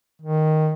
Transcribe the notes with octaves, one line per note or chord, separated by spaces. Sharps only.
D#3